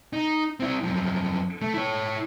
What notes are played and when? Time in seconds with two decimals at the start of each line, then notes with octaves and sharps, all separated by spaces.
0.13 D#4
0.60 C4 E4
0.84 F#2 F3
1.62 A3
1.74 E4 C#5